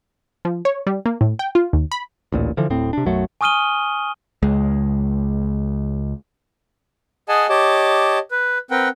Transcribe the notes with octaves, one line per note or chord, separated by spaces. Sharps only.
F3
C#5
G3
A#3
A2
G5
F4
D#2
B5
A1 D2 A#2
D3 E3 F3
D1 A2 C4
C3 D4
B1 F#2 F#3 A3
G#5 C#6 D#6 F6 D#7 G7
C#2 G#3
G#4 D#5 F#5 G#5 A5
G4 C#5 D#5 A5 D6
B4
C4 A#4 B4 F#5 G5